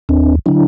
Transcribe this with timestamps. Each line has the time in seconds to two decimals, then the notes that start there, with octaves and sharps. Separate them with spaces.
0.09 D#2 C4 D4
0.46 D3 F#3 D4 E4